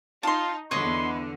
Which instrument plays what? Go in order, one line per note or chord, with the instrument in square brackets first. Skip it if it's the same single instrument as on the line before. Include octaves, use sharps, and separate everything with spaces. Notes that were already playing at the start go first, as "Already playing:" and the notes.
[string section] D#4 [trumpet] F4 [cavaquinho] A5 C6
[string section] E2 D3 [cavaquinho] B4 C#5 D#5 [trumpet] C6